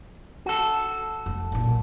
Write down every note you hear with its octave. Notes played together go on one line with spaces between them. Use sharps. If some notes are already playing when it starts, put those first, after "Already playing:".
F#4 A4
F1
B1 A#2